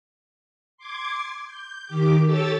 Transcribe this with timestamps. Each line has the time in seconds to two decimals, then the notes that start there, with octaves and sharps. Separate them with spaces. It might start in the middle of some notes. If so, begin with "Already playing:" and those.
0.77 C6 D6 G#6
1.46 G6
1.85 D#3 G4 D6
2.25 G4 A4 C#5 E6 A6